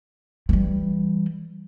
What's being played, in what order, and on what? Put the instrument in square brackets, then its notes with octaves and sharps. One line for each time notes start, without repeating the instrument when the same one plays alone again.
[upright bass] E3 G3